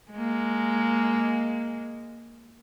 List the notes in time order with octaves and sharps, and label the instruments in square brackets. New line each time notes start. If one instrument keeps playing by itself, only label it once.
[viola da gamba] G#3 A#3